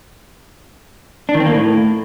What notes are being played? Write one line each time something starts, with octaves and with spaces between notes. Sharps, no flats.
D4
D#3
C4
A#3
A2